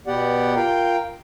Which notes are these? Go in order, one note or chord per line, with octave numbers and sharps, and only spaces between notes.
B2 B3 G4 D5 F#5
F4 A#4 F5 G5